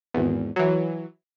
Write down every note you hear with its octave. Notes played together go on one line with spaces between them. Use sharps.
G#1 E2
E3 F#3